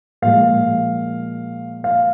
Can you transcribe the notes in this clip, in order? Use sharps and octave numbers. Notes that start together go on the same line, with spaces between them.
A#2 F3 G#3 F5
F5